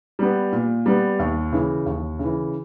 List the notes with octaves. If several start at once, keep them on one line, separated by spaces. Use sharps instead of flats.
G3 B3
A#2
G3 B3
D#2
C#3 E3
D#2
C#3 E3